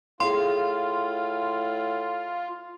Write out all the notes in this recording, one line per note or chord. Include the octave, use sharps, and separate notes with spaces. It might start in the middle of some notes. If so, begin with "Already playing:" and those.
A2 F4 G#4 F5 C6